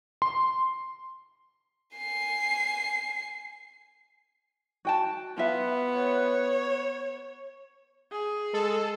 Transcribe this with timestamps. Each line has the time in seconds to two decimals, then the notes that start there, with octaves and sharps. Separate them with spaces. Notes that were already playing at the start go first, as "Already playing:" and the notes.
0.22 C6
1.97 G#5 C7
4.85 F#4 G5 A5
5.38 B3 F4 E5
5.93 C#5
8.12 G#4
8.54 G#3 A4